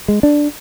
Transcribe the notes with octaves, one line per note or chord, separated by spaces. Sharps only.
G#3
D4